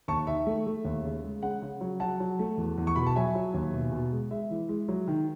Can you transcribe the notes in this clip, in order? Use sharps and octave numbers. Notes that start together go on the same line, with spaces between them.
D#2 A5 C#6
D#3 E5
A3
A3
D#2
C#3
G#3
C#3 F#5
C#3
F#3
F#3 F#5 A5
F#3
A3
E2
E2
C#6
B2 B5
A5
F#3 E5 G#5
F#3
D#2
B2
B2
G#3
G#3 E5
E3
G#3
F#3
D#3